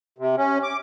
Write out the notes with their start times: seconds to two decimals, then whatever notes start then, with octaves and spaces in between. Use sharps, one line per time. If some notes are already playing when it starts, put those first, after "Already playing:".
0.18 C3
0.37 C#4
0.63 D6